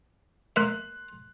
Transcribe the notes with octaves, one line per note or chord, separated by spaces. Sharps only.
A#3 E5 C6 F#6